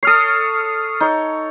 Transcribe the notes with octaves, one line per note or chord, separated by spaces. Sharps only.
A4 C#5 D#6 F6 C7
D#4 C#5